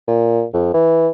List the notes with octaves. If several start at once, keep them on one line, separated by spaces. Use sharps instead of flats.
A#2
F2
E3